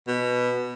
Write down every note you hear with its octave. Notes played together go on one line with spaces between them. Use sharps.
B2